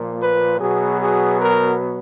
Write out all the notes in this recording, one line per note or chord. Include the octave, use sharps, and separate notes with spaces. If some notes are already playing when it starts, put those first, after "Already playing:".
Already playing: A#2 F3 A#3
B4
B2 F#3 B3 G#4
G#4
A#4